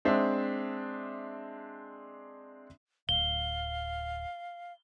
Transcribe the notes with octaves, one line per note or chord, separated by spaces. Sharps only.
G#3 C4 D4 E5
D1 F5 G7